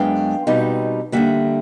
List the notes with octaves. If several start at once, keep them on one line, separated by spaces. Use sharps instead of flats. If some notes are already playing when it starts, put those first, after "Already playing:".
Already playing: F#2 G#3 B3 D4 F5 G5
B2 G3 C4 D#4
D3 G3 A#3 E5 F#5